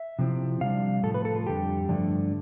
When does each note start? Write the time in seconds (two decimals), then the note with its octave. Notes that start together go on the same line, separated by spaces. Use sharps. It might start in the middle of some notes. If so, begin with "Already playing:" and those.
Already playing: E5
0.19 C3 F3 C4 E4
0.61 C3 G3 D4 F5
1.03 A2 F3 A3 A4
1.14 B4
1.25 A4
1.35 F4
1.47 F2 D3 G3 G4
1.89 G2 D3 F3 A3 D4